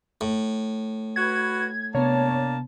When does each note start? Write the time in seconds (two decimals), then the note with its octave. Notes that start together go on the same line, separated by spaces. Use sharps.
0.21 A2
1.16 F#4 B4 G#6
1.95 C3 A#3 B3 D4 C#5 A5